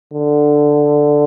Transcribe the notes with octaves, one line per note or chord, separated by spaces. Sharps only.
D3